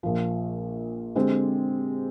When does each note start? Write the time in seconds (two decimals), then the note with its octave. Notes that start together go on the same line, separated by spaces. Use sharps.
0.03 A#1 A#2 F3
1.16 D3 G#3 C4 G4 C5